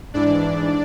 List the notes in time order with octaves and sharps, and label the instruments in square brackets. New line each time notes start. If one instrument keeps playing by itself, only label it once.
[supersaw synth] G#2 E3 D4 D5